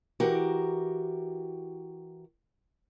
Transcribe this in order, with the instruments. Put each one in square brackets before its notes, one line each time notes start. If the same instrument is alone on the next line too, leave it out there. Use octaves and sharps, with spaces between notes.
[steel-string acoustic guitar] E3 F#4 G4 A#4